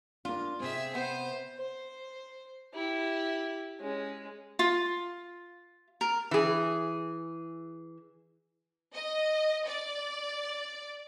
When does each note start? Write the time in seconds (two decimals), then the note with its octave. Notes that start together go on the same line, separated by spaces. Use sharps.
0.25 A#3 D4 F4
0.60 C3 C4 G#4 E5
0.95 B3 C5
1.56 C5
2.74 E4 G4
3.80 G#3 C#4
4.59 F4
6.01 A#4
6.31 E3 G#4
8.94 D#5
9.67 D5